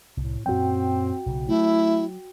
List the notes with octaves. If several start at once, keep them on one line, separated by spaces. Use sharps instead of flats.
C2 A2
F#2 A#2 F#3 C4 F#4 G5
B1 C#3
F#3 A3 E4